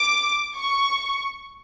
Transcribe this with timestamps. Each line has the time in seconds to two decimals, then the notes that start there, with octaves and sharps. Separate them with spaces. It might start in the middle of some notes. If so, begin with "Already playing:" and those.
Already playing: D6
0.57 C#6